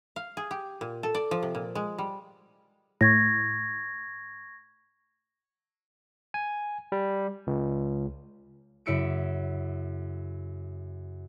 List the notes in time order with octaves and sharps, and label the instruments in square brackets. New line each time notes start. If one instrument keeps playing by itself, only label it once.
[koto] F5
G#4
G4
A#2
A4
D5
F3
C3
A#2
G#3
G3
[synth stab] A2 [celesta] C#6 G#6 A#6
[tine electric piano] G#5
G3
C#2
[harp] F#2 C#3 E4 E6 C#7 D7